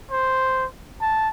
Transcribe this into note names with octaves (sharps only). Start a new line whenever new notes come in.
C5
A5